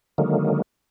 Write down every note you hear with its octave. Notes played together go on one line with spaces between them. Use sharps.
D3 D#3 F#3 G#3 A#3